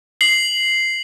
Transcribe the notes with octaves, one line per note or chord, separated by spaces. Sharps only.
C7 F#7